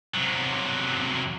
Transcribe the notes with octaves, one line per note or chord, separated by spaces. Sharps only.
C3 F#3